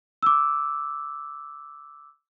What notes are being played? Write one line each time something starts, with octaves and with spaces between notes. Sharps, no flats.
D6 E6